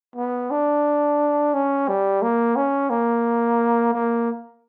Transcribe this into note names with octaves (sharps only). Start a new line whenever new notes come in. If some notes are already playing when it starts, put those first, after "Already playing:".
B3
D4
C#4
G3
A#3
C#4
A#3
A#3